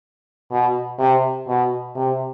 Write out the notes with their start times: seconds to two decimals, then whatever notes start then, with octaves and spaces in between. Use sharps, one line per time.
0.51 B2
0.99 C3
1.48 B2
1.96 C3